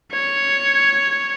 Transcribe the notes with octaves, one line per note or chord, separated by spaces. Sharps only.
C#5